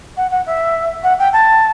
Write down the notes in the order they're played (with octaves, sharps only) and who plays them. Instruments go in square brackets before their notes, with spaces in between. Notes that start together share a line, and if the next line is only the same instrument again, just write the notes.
[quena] F#5
F#5
E5
F#5
G5
A5